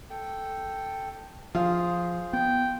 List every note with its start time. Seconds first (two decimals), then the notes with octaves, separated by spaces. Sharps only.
0.10 A4 G5
1.55 F3 F4 G#4 C5
2.33 B3 G5